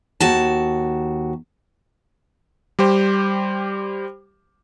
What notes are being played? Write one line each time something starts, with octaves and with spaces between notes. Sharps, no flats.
D#2 F#4 A5
G3 G4 C5